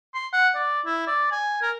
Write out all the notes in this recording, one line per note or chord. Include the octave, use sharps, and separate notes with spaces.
C6
F#5
D5
E4
D5
G#5
A#4